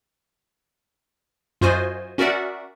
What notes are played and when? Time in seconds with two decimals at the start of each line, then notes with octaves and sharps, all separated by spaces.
1.61 F#2 F4 F#4 C5 D#5 G#5
2.18 C#4 F#4 A#4 D5 E5 F#5